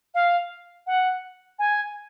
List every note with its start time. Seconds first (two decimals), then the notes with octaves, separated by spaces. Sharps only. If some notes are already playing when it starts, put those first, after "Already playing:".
0.14 F5
0.87 F#5
1.59 G#5